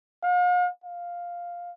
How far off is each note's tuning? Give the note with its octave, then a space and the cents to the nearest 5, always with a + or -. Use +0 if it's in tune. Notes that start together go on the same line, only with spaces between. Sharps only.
F5 +45
F5 +5